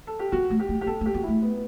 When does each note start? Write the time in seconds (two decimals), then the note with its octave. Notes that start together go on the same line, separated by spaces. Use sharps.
0.07 A4
0.19 G4
0.32 B3 F#4
0.50 A3
0.60 G4
0.69 A3
0.81 G4
0.87 B3 A4
1.01 A3
1.06 G4
1.14 B3 F#4
1.23 A3 E4
1.42 B3